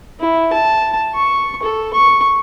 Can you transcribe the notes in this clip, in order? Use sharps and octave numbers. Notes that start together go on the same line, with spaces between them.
E4
A5
C#6
A4
C#6